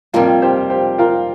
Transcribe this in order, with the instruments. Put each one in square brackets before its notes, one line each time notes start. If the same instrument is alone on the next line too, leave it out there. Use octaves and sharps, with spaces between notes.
[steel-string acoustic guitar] F2 C3 G3 A#3 [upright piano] F4 A#4
[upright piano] G4 C5
G4 C5
F4 A#4